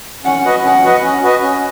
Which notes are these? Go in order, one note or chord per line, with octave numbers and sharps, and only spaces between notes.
C#4 F#5
F#4 B4 D#5
C#4 F#5
F#4 B4 D#5
C#4
F#4 B4 D#5
C#4